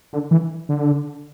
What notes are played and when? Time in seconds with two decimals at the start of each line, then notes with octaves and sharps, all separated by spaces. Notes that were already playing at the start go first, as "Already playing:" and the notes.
0.13 D3
0.31 E3
0.69 D3